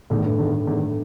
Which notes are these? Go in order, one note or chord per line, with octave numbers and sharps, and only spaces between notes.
E2 A2 D#3 A3
G2
E2 D#3 A3
E2 D#3 A3